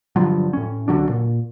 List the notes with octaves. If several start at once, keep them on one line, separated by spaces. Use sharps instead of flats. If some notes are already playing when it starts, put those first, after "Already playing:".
G2 D3 F3 F#3
A2 C#4
C2 D3 F#3 D4
A#2